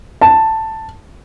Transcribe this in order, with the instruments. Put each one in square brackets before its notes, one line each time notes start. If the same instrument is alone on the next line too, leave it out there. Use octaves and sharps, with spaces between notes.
[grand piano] A5